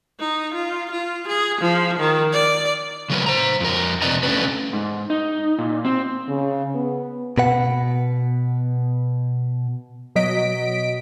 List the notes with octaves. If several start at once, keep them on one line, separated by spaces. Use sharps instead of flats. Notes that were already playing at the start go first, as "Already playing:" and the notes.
D#4
F4
F4
G#4
F3
D#3
D5
C#3 F#3 A3 F4 A#4 B4
C5 A#5
F2 A#4
F2 C3 B4 D5 D#5 A#5
E2 A3 C#4 D4 B4
G#2
D#4
A#2
C4
C#3
B3
B2 B4 F#5
B2 F#3 D#5 B6 D7